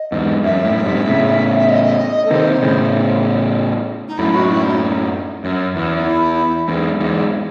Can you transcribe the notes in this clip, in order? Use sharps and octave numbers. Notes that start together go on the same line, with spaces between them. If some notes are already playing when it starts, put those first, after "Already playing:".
Already playing: D#5
E2 G#2
F#2 E5
F#2 A2
G#2 C3
A2 C#3
E5
D#5
A4
C3 D#3 C5
A2 C#3
D#4
F#2 A2 E4
F#4
E4
D#4
F#2
E2
D#4
E4
E2 G#2
E2 G#2